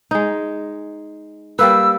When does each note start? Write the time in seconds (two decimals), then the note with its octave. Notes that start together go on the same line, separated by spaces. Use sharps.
0.11 G#3 D#4
1.59 G3 A#3 B4 E6